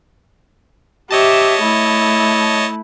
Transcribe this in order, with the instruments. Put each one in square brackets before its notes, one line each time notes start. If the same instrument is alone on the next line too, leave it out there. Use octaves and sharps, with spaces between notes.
[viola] G4 E5 [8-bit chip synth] C#5 D#5 A5
[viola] A3 E4